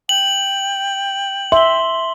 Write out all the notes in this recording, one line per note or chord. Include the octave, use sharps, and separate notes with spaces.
G5 F#7
E5 C6 G7